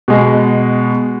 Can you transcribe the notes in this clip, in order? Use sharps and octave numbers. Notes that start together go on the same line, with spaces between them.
B2 G#3